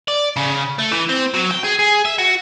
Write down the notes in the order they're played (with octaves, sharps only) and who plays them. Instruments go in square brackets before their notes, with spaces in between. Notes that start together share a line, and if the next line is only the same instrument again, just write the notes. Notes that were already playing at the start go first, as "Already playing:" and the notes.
[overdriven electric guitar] D5
C#3
A3
E3
C4
F#3
G5
G#4
G#4
E5
F#4